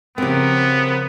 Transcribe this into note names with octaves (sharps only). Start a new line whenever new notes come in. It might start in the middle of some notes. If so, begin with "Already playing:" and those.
C#3 F3 B3 C4 G4 A#4